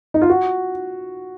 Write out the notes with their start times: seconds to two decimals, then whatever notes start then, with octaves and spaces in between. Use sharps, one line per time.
0.14 D#4
0.21 F4
0.30 F#4